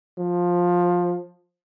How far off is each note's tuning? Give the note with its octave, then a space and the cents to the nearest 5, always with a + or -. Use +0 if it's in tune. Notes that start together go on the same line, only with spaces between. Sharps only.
F3 +15